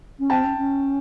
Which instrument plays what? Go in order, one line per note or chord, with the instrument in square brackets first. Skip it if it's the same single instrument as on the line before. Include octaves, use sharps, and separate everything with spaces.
[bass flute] C#4
[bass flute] C4 [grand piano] G5 A5
[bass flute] C#4
C#4